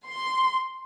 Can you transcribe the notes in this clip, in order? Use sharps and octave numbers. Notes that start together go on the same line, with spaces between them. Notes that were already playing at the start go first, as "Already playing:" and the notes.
C6